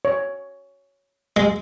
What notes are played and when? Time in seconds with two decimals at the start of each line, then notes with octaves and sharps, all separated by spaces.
0.05 C#5
1.36 G#3